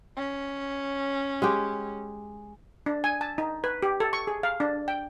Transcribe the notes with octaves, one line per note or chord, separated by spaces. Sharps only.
C#4
G#3 G4
D4
G#5
A5
D#4
B4
G4
A4
C#6
G#4
F5
D4
G5